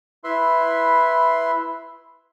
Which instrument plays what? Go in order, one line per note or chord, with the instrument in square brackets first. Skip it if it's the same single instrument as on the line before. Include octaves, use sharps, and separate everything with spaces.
[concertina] E4 B4 E5 C6